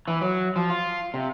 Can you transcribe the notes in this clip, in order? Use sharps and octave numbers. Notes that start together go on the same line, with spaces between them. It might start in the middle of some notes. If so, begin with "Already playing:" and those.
E3
F#3
F3
F4
C3